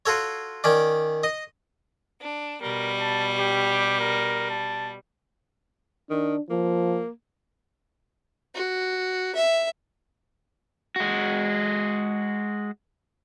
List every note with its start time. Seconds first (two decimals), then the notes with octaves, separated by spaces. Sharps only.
0.06 F4 F#4 A4 C#5
0.64 D#3 C#4 D5
1.24 D#5
2.20 D4
2.61 B2 G3 A#4
3.00 A5
3.38 G4
4.00 A#4
4.50 A5
6.10 D#3 D4
6.50 F3 A#3
8.55 F#4
9.35 E5
10.96 G#3 F#4